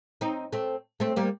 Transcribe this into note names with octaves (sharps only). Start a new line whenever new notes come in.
C4 D#4
A3 C4
A3 C4
G3 A#3